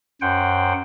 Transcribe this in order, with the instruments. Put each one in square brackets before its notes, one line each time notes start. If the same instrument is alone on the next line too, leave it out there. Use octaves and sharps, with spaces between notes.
[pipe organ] F#2 C5 F#5 G5